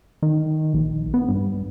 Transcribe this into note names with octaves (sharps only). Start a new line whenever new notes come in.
D#3
A#1
B3
G2